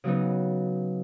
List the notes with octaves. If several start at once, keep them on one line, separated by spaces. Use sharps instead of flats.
C#3 F#3 B3 D#4